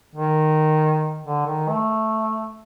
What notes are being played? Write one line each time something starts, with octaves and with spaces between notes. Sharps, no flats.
D#3
D3
D#3
A3